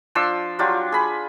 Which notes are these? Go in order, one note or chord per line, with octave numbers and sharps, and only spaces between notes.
F3 D4 C6 E6
F#3 D4 F4 G4
G#4 B5